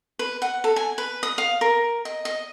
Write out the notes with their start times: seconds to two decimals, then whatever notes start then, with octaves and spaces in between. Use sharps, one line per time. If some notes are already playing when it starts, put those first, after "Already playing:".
0.19 B4
0.42 F#5
0.64 A4
0.76 G#5
0.98 B4
1.23 D#6
1.38 F5
1.61 A#4
2.05 D#5
2.25 D#5